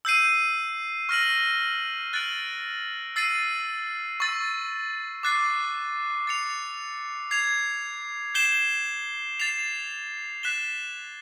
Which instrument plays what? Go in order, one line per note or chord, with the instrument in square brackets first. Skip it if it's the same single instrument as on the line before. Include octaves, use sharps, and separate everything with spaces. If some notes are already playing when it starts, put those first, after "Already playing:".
[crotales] E6 G6 C7 D#7
C#6 F6 A#6 D#7 F#7
F#6 A6 D7 F#7
E6 A6 C7 D#7
C#6 E6 A6
D6 F#6 A6 C7
A6 C#7 F7
G#6 C7 F7
G6 C7 E7 G7
A6 C7 F7
F#6 B6 E7 G7